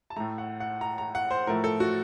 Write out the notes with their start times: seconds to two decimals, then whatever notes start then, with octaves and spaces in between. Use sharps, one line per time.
0.10 A5
0.16 A2 A3 A#5
0.38 F#5
0.60 F#5
0.81 A#5
0.98 A#5
1.15 F#5
1.31 C5
1.47 A2 F3 A3 A#4
1.64 A4
1.80 F#4